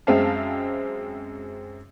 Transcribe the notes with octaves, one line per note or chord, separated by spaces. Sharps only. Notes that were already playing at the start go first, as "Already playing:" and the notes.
F#2 G#3 C4 E5 F5 A5